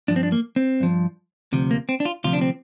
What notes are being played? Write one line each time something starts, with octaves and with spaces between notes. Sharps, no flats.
G2 F3 D4
C4
D4
A#3
C4
G2 F3
D2 C3 F3
A#3
C4
D4
F4
D2 C3 F3 F4
D4
C4